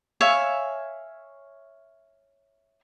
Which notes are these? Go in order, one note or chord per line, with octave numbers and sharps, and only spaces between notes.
C#5 E5 F5 G#5